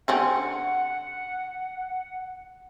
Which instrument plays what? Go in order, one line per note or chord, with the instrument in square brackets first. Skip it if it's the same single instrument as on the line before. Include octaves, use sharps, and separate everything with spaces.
[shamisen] D3 C4 C#4 [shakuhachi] F#5